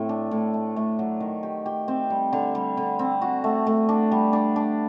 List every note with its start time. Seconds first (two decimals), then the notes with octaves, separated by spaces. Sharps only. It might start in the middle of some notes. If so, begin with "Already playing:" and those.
Already playing: A2 A3 C4
0.09 D4
0.31 A2
0.54 A3
0.76 A3
0.99 F#3
1.20 D#3
1.43 G4
1.66 G4
1.88 C4
2.10 G3
2.33 D3
2.55 G3
2.77 D3
2.99 C4
3.21 F#4
3.44 A3
3.67 A3
3.89 D4
4.11 G3
4.33 D4
4.56 D4